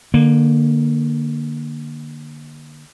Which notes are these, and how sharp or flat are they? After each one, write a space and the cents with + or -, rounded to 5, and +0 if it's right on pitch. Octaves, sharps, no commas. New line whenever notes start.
D3 +25 A#3 +10